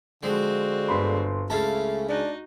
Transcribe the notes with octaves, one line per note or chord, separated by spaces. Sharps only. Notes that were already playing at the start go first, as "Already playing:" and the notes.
D3 F3 G#3 C4 F#4
G1 B5 C6
C#2 A3 C#4 E4 F5 A5
D4 D#4 F#4